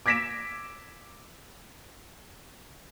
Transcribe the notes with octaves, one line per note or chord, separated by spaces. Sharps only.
D6 G#6 A#6 B6 D7 E7